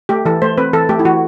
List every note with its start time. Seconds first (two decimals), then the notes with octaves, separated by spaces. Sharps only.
0.09 A3 G4
0.25 E3 A4
0.42 A3 C5
0.58 C4 B4
0.73 E3 A4
0.89 A3 G4
0.99 E4
1.05 E3 F#4